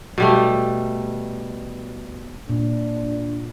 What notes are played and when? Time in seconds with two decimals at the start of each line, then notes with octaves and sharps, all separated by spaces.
0.18 B2 G3 A3
2.49 A#2 D4